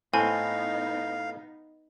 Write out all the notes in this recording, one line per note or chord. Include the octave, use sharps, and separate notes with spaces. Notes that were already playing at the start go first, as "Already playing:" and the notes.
A2 B3 C4 D#4 F5 G#5